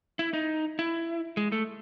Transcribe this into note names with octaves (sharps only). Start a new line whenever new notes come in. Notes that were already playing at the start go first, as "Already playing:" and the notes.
E4
D#4
E4
G#3
A3